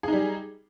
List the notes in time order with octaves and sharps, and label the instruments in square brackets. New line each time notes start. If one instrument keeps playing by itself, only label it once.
[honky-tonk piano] G#4
D#4
G3